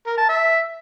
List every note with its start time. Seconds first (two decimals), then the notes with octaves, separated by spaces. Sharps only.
0.07 A#4
0.18 A5
0.29 E5